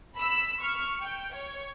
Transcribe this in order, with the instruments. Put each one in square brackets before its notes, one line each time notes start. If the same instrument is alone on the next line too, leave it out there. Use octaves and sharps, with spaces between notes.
[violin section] B5 E6
C#6 F6
G5
C#5